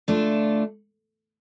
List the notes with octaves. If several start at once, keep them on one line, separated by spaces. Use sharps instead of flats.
D3 A3 D4 F4